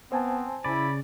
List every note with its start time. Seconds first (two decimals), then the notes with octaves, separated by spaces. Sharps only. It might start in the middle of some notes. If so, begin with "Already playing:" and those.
0.12 B3 C4 C5 G#5 A5
0.64 C#3 E4 D5 B5